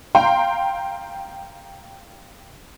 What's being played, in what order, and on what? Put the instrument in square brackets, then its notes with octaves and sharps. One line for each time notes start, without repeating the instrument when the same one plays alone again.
[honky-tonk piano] F5 G5 A#5 C6